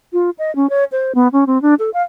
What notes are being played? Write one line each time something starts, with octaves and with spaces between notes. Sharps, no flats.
F4
D#5
C#4
C#5
C5
B3
C#4
C4
D4
A4
F5